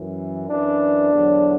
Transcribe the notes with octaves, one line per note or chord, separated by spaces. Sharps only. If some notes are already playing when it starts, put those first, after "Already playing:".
Already playing: F#2 E3
F#2 E3 D4
E2 D3 F#3